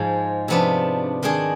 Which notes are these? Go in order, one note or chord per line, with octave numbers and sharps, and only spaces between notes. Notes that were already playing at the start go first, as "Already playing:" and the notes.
Already playing: G#2 F3 G#3
C3 F3 B3 D4
D#3 G#3 D4 G#4